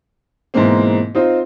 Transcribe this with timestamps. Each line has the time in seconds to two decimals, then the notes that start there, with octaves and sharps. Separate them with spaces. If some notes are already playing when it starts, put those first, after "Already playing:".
0.54 G#2 B2 E3 G#3 A#3 C4
1.15 C4 D#4 F4 C5